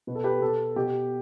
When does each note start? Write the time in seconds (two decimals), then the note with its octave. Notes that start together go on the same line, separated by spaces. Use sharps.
0.07 B2 B4
0.15 A4
0.24 G4 B4
0.41 B2 A4
0.76 B2 G4